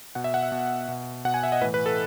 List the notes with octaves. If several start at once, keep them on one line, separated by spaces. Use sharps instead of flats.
B2 F#5
E5
F#5
E5
B2
B2
B2 F#5
G#5
E5
D#5
A2 E3 B4
B4
A4